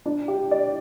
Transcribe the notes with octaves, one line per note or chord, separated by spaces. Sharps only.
D4
G4
D5